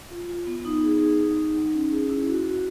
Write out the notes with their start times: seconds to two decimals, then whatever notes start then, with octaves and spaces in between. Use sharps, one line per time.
0.10 F4
0.29 F4
0.47 B3
0.65 D#4
0.83 G#4
1.01 G#4
1.19 D#4
1.37 D#4
1.56 F#3
1.73 C#4
1.92 G#4
2.09 E4
2.27 F#4
2.45 F#4